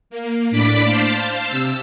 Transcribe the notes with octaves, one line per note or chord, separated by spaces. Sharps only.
A#3
A2 D4 D5 B5 D6 B6
C5 F5 A5
C3 E6